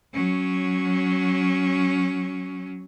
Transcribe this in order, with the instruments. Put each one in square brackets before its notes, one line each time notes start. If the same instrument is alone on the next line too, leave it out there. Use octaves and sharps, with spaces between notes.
[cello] F#3 C#4